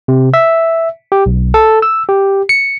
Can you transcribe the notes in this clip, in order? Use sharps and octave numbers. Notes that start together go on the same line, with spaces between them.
C3
E5
G4
B1
A4
E6
G4
C#7